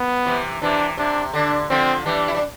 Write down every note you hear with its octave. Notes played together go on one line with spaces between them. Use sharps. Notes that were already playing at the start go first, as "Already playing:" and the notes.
Already playing: B3
C3 E3
C3 E3 D4
C3 D4
D3 D4
D3 F3 C4
E3 G3 D4
E4
D4